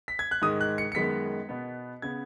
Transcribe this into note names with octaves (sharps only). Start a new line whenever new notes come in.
B6
G#6
F#6
G#2 D#3 G#3 D#6
F#6
C#7
C#7
F#2 D#3 G#3 B3 B6
B2 B3
C#3 B3 G#6